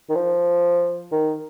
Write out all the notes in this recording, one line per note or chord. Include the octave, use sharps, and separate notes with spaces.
D#3
F3
D#3